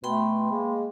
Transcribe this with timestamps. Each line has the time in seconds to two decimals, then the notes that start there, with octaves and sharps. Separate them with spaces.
0.04 B2 A3 G5 B5 C6
0.51 G#3 A#3